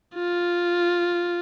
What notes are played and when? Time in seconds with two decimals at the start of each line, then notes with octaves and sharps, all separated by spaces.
0.15 F4